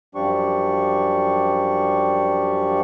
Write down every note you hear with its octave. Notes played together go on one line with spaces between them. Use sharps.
F#2 F3 G3 D4 G4 C#6